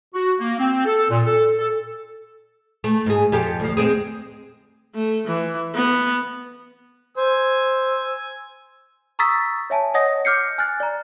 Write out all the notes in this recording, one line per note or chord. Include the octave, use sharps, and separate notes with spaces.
F#4
A#3
C4
A4
A#2
A4
A4
A3
G#2 G#4
F2 G4 A4
D2 F3
G#3 C4 G#4
A3
E3
B3
C5 G#5 E6
A#5 C#6 D#6 E6 A6 B6
C#5 E5 G#5 A5
C#5 D#5 F#5 D#6 A#6
D6 F6 G6 C7 C#7
G#5 F6 F#6 A6
D5 A#5